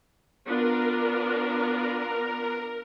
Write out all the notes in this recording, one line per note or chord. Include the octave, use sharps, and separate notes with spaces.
B3 D4 F4 A#4